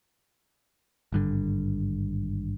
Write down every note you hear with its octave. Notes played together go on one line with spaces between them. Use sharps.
G#1 G2 D3